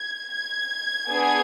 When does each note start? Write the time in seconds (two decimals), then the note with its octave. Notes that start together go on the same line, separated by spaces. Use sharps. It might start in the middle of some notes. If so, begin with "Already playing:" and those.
Already playing: G#6
0.32 G#6
1.10 B3 D4 G#4